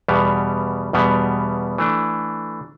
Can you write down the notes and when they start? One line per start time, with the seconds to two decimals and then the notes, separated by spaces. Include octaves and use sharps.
0.08 E2 B2 G3 B3
0.93 E2 B2 G3 B3
1.78 E3 A3 D4